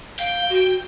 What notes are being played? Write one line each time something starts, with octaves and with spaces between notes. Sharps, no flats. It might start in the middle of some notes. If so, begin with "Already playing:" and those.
F5 G5
F#4